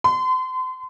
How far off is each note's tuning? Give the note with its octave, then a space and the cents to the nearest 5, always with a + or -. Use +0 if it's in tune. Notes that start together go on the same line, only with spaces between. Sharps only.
C6 -35